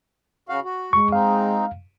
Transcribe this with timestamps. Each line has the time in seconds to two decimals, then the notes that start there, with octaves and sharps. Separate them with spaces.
0.49 C#3 F#4 F5
0.65 F#4
0.93 G#3 C#6
1.12 C4 D#4 F5